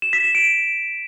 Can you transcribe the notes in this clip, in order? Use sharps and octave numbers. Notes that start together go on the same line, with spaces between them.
E7
B6
E7
D7